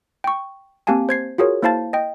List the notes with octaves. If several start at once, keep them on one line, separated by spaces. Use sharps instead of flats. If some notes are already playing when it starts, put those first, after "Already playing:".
G5 C#6
A#3 C4 G4 F5 G#5 A5
C5 G#6 C7
F4 F#4 G#4 A#4 C#5
A#3 E4 C5 F5 A5 A6
D#5 G5